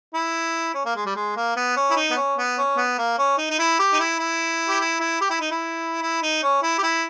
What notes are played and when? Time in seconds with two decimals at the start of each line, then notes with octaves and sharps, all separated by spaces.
0.14 E4
0.74 C#4
0.85 A#3
0.96 G#3
1.06 G3
1.16 G#3
1.36 A#3
1.56 B3
1.76 C#4
1.90 E4
1.96 D#4
2.10 B3
2.16 C#4
2.37 B3
2.58 C#4
2.77 B3
2.98 A#3
3.18 C#4
3.38 D#4
3.50 D#4
3.59 E4
3.79 G4
3.93 D#4
4.00 E4
4.19 E4
4.68 G4
4.80 E4
5.00 E4
5.21 G4
5.30 E4
5.40 D#4
5.51 E4
6.02 E4
6.22 D#4
6.43 C#4
6.62 E4
6.78 G4
6.83 E4